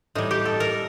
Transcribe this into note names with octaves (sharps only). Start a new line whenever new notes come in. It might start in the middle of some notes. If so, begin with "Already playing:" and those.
A2 G3 D#4
G4
A4
A#4